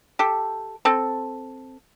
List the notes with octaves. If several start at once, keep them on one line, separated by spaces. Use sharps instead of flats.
G4 A4
C4 A4